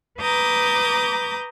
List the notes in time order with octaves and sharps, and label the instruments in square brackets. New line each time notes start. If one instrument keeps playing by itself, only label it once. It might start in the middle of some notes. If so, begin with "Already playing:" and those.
[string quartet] B4 A#5 D6 D#6 G6